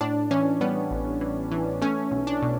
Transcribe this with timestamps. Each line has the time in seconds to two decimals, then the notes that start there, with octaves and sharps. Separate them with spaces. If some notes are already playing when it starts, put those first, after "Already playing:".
0.01 A2 D4
0.31 E3 C#4
0.61 G3 B3
0.91 A1
1.21 E3
1.52 E3
1.81 A3 C#4
2.11 B1
2.27 D4
2.42 B2